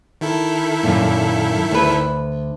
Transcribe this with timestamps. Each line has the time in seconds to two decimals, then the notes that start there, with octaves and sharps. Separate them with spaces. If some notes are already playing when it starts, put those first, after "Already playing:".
0.21 D#3 E4 A4
0.83 F#2 A#2
1.71 D2 B4